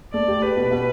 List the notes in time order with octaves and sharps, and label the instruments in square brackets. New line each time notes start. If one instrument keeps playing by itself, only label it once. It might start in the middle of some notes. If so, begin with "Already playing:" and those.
[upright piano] A3 [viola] D5
[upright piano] G4
[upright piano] G4 [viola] B4
[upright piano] B2
B2